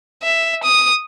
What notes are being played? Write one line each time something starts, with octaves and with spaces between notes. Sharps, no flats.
E5
D#6